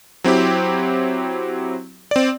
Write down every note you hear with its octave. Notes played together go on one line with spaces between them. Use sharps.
F#3 C4 E4 G4
C4 D5